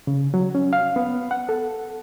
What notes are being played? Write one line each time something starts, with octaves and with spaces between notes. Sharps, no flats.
C#3
F#3
C#4
F5
B3
F#5
A4